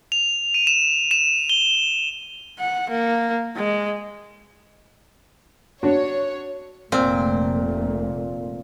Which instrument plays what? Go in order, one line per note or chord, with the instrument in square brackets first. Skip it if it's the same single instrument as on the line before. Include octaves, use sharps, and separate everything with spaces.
[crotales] F7
D#7
E7
E7
G7
[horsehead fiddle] F#5
A#3
G#3
[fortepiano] D4 F#4 [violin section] C#5
[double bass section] F1 A3 A#3 [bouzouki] A#2 [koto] C4